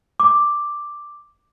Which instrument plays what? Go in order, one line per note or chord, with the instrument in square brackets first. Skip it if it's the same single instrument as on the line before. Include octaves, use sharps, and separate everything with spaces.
[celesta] D6